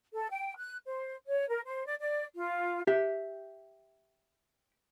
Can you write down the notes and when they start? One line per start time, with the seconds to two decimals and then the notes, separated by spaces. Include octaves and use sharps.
0.12 A4
0.30 G5
0.57 F#6
0.87 C5
1.26 C#5
1.49 A#4
1.65 C5
1.86 D5
2.00 D5
2.35 F4
2.87 G4 E5